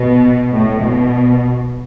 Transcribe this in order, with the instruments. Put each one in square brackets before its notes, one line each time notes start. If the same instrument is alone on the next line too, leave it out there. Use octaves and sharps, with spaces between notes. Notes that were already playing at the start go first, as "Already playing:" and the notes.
Already playing: [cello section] B2
A2
B2